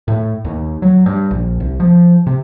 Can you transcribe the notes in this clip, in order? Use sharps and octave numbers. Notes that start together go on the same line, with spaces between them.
A2
D#2
F#3
G2
A#1
C2
F3
C3